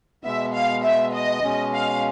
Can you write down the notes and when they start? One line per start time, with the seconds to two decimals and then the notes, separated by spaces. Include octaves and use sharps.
0.24 B2 G#3 B3 E5
0.54 F5
0.84 E5
1.14 D#5
1.44 B2 G#3 C#4
1.73 F5